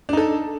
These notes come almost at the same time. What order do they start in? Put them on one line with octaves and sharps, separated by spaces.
D4 D#4 A4